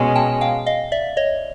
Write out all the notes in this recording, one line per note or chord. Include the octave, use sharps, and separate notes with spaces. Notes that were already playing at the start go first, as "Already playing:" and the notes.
Already playing: B2 G#3 C#4
G5 A5
F5 G5
D#5 F5
D5 E5
C#5 D#5